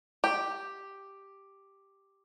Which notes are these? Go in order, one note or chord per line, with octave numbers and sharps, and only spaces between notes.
G4